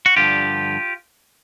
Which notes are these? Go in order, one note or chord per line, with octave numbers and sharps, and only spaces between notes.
F#4
G2 D3 F3 F4 G4